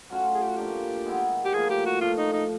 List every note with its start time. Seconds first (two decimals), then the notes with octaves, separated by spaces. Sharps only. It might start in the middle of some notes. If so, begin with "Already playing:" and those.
0.10 F#3 A3 C#4 F4 F#4
0.34 G#4
0.41 G4
0.49 F#4
0.56 A2 F3 A#3 D4 G4
1.06 D#3 G#3 B3 E4
1.45 G4
1.53 A2 F3 A#3 G#4
1.70 G4
1.86 F#4
2.01 A2 F3 A3 F4
2.17 D#4
2.33 D#4